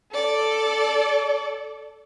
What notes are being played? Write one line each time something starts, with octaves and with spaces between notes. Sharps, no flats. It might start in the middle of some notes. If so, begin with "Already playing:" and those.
A4 D5